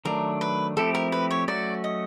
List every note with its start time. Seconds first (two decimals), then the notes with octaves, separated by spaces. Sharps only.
0.05 D#3 F#3 A3 D4 A#4
0.41 B4
0.77 F3 A3 C4 E4 G4 A4
0.95 A#4
1.12 B4
1.31 C#5
1.48 F#3 A3 C#4 F#4 D5
1.84 D#5